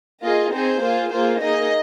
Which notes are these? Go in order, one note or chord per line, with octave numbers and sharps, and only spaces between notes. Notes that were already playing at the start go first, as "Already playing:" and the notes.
A#3 F4 G#4 D#5
C4 D#4 G#4 C5
A#3 F4 G#4
A#3 F4 G#4 C5
A#3 D#4 G#4 D#5